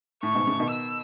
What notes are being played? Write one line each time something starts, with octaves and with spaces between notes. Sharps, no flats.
A2 C#6
G#2 B2
A2 C#3
B2 D#3
E6